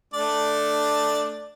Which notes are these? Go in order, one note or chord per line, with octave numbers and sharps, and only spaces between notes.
A3 D4 D5